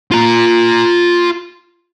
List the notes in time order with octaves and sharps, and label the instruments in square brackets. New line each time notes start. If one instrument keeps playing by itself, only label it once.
[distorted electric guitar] F4 A#5